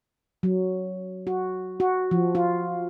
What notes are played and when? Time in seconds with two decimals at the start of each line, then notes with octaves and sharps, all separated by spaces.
0.43 F#3
1.27 F#4
1.80 F#4
2.11 F3
2.35 F4